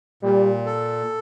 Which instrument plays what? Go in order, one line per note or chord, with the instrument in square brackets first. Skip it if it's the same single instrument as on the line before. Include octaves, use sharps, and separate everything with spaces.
[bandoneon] A#2 [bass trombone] G3
[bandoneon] A4